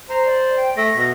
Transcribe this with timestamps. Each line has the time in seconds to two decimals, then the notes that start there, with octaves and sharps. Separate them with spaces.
0.09 C5 A#5
0.26 D5
0.57 G5
0.77 A3 A#6
0.96 B2